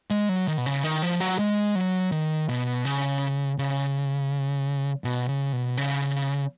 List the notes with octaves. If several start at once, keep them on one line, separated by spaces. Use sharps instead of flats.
G#3
F#3
D#3
B2
C#3
D#3
F3
F#3
G#3
F#3
D#3
B2
C#3
C#3
B2
C#3
B2
C#3